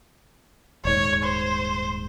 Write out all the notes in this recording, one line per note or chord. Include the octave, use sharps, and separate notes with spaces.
D#1 G#2 C#5
C5